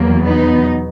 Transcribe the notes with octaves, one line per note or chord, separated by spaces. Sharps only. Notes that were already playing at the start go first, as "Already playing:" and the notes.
Already playing: E2 B2 F#3 A#3
B3 D#4